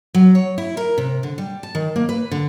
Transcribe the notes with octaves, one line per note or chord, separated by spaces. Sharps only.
F#3
C#5
E4
A#4
C3
D3
G3
A5
D#3
A#3
B4
D3